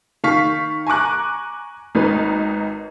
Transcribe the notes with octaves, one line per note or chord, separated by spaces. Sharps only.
D#3 F5 C#6 B6
G#5 A#5 C#6 D6 F#6
G#1 D#4 B4